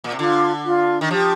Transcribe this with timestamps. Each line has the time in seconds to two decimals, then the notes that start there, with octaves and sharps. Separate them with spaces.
0.04 A#2
0.12 C3
0.19 D3 F4
0.65 F4
1.01 D#3
1.11 F3 G4